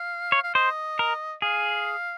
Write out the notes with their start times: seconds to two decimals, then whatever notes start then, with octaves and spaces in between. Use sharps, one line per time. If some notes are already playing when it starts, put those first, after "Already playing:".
Already playing: F5
0.32 C#5
0.43 F5
0.55 C5 D#5
0.99 A#4
1.42 G#4 F5